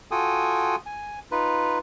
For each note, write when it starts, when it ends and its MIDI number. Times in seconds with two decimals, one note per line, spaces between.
0.11 0.76 65
0.11 0.76 66
0.11 0.76 69
0.11 0.76 79
0.11 0.76 80
0.11 0.76 87
0.86 1.19 80
1.32 1.79 63
1.32 1.79 65
1.32 1.79 71